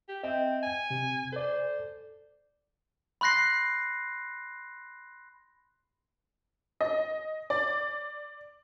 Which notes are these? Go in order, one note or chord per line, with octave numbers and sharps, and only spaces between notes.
G4
C4 D#5 E5 G5
G#5
C3
A4 C5 D5
B5 C6 F#6 A#6 C7
D#5
D5